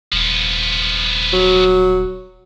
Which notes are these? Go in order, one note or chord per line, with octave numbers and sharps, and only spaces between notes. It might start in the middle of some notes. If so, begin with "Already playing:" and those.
D#1 F3 B3
F#3